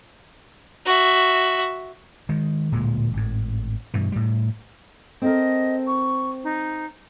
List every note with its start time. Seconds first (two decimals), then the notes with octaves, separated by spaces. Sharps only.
0.86 F#4 E5
2.29 D#3 G#3
2.72 D1 A#2 G#3
3.14 G#1 A2
3.94 G2 B2 E3
4.12 A2 G3
5.22 C4 A4 A#4 D#5
5.87 C#6
6.44 D#4